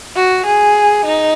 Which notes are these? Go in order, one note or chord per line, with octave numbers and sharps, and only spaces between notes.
F#4
G#4
D#4